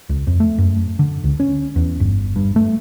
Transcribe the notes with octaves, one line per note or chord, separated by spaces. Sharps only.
C#2
F2
A3
F#2
D3
C#2
C#4
E2
G1
G2
A3